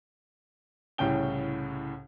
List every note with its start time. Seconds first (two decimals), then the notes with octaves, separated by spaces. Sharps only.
0.98 C2 A2 C#3 C#4 G5 G7